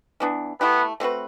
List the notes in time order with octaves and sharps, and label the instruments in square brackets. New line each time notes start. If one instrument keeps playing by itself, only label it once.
[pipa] E3 B3 D4
[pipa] A3 E4 G4 [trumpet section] B3
[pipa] A3 C4 F#4 B4